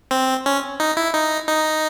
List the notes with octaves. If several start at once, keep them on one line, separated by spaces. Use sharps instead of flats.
C4
C#4
D#4
E4
D#4
D#4